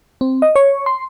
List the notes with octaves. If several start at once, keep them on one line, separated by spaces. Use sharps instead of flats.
C4
D#5
C#5
C6